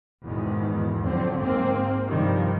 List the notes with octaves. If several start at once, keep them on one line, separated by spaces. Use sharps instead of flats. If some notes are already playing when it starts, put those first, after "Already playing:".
E2 G#2 B2 D#3
D3 F3 F#3 C4
G#2 A#3 C4
G2 C3 D#3 F3 G3